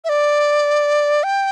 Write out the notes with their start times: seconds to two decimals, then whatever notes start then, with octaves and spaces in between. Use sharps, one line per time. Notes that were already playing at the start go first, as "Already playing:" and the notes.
0.05 E5
0.09 D5
1.24 G5